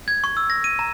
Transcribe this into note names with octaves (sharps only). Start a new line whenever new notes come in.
G#6
C#6
E6
A#6
D#7
A#5